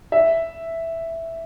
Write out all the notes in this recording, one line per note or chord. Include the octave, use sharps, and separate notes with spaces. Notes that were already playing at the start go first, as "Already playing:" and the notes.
E5